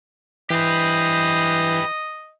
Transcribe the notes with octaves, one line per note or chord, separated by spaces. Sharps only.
E3 G4 B4 C5 D#5